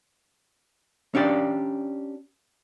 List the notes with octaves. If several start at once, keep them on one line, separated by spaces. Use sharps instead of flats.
C#4 D4 G4 D5